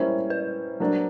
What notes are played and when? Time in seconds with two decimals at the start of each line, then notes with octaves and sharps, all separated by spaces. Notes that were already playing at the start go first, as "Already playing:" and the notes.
Already playing: G3 A#3 C#4 E4 C5
0.30 B4
0.80 F#3 A#3 D4